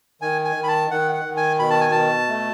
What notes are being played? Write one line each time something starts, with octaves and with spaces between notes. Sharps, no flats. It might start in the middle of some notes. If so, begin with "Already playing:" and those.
D#3 G#5
G#5
D#3
B5
A5
D#3 F#5
F#5
D#3
G#5
B2 B5
A5
G#5
B2 A5
A3